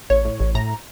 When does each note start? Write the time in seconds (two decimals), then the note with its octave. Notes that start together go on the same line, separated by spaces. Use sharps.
0.10 A1 C#5
0.25 A2
0.40 A1
0.55 A2 A#5